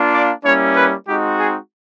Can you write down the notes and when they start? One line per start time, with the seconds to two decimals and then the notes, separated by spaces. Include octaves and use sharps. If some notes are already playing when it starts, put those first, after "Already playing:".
Already playing: A#3 D4 F4
0.14 D5
0.45 G3 A#3 C#4 E4 C#5
0.76 B4
1.07 G#3 C4 D#4 F#4 G4
1.40 G#4